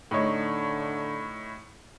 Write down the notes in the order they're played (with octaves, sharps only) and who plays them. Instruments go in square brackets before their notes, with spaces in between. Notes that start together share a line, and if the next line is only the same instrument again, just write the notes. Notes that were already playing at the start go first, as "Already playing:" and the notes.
[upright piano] A2 D#4 C#5 [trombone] D3